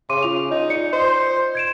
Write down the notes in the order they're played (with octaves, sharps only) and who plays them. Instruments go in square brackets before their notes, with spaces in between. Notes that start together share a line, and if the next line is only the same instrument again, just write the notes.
[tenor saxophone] C#3 [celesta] C6 D6 D#7
[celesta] F4 F7
[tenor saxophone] D#4
[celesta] F4 D5 C#7
[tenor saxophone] C5
[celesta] G#6 D7 E7